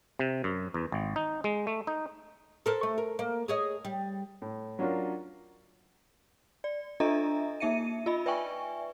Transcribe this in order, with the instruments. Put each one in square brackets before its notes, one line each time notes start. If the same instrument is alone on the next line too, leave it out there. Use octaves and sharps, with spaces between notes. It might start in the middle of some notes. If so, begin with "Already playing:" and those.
[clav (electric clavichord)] C3
F#2
E2
G#1
D#4
G#3
A3
D#4
[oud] A4 A#4 C5
A3
A#4
A#3
G#4 C#5 D#5
G3
[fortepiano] A2
F#3 C#4 D4 F4 A#4
[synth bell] D5
D4 F4 A4 D#5 E5 A#5
A#3 D#4 E5 C#7 D#7
F4 D#5 B5
B4 D5 E5 G5 G#5 C#6